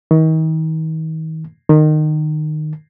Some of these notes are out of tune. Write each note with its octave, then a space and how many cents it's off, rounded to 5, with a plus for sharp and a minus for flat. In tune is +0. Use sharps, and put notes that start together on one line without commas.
D#3 +40
D#3 -20